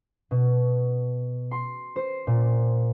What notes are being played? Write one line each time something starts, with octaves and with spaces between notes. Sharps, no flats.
B2
C6
C5
A#2